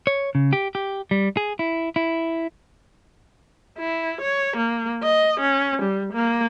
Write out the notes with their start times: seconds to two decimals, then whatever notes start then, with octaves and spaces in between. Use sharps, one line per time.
0.07 C#5
0.35 C#3
0.53 G4
0.75 G4
1.11 G3
1.37 G#4
1.59 E4
1.96 E4
3.79 E4
4.21 C#5
4.57 A#3
5.03 D#5
5.40 C#4
5.82 G3
6.13 A#3